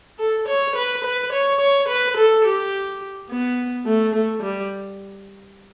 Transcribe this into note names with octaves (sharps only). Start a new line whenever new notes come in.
A4
C#5
B4
B4
C#5
C#5
B4
A4
G4
B3
A3
A3
G3